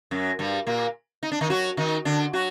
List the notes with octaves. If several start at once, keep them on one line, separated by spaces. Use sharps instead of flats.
F#2 F#3
G2 G3
A#2 A#3
D#4
D4
D#3 D#4
F#3 F#4
D#3 D#4
D3 D4
F#3 F#4